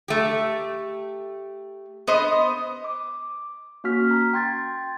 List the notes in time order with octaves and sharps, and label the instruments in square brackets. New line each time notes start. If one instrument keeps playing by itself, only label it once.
[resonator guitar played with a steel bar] A3 G4
B3 C5 D#5
[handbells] D6
A#3 C#4 F#4 F6 B6
A#5
G5 C6 G#6 A6